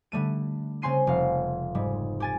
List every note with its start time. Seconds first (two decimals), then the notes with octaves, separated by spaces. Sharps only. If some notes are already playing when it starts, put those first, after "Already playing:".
0.12 D3 G3 A3 D#7
0.82 C#3 C4 G#5 C6 C7 D#7
1.07 F1 F5
1.75 G#2 G3 G#3
2.20 G4 G#5 A6